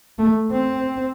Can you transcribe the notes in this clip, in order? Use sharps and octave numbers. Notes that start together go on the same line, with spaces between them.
A3
C4